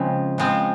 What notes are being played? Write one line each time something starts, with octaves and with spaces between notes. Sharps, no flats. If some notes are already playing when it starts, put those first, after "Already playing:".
Already playing: C#3 F3 G#3 C4
C#3 F3 G#3 C4